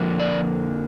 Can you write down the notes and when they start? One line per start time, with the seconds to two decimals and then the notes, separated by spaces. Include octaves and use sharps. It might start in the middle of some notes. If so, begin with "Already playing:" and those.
Already playing: F2 D3 F3 A#3
0.20 D5